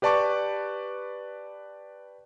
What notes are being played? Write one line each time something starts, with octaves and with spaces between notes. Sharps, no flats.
G4 B4 D5 A5 C#6 D6